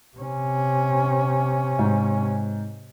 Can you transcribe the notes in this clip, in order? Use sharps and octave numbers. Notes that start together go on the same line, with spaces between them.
C3 C#4
G#2